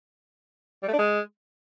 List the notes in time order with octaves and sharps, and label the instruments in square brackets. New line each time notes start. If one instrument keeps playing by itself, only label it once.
[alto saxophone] G3
A3
D4
G#3